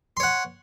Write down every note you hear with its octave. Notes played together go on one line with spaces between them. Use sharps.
C#5 F#5 C6